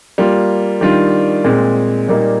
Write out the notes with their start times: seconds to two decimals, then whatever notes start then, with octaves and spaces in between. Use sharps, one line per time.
0.18 G3 A#3 F4
0.81 D#3 G3 D4 F4
1.44 A#2 G#3 C4
2.08 A#2 G3 A#3 D#4